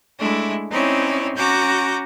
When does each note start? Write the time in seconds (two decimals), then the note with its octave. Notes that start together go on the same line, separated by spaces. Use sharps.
0.19 G#3 A3 D4 E4
0.69 C4 C#4 D#4 E4 C#5 D5
1.35 C#4 F#4 A#5 D6 G6